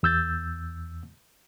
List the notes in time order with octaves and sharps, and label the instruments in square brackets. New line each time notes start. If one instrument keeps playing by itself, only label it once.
[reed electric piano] E2 E6 G6 A6